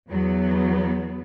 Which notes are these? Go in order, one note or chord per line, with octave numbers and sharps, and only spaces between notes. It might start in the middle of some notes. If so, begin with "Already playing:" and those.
E2 F#3 B3